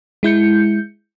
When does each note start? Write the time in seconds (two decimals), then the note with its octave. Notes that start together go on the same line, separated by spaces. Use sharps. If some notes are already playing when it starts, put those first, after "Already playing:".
0.23 G#3 E4 G6 C#7